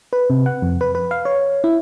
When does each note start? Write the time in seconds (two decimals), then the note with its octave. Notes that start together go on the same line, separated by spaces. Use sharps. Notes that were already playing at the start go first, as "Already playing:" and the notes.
0.13 B4
0.30 C3
0.46 F#5
0.62 F2
0.81 B4
0.95 B4
1.11 F5
1.25 C#5
1.64 E4